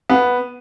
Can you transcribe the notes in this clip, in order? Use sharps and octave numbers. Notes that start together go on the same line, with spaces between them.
B3